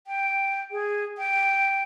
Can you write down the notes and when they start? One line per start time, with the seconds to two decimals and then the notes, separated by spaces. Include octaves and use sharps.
0.07 G5
0.71 G#4
1.18 G5